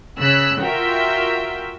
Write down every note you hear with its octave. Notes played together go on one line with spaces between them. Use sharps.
C#3 E6 F#6 B6
F4 F#4 A#4 E5 G5